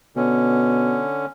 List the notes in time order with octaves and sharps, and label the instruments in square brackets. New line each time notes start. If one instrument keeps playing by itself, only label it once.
[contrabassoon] B2 [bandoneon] D3 C#4